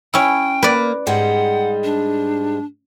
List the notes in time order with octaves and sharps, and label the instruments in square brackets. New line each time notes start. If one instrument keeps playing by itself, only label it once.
[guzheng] C#4 E4 [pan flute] G5
[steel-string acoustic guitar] A#3 [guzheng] B4 D5
[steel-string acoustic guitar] G#2 G3 G#3 [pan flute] F#5
[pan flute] D4